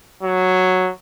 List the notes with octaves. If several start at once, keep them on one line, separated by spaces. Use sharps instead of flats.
F#3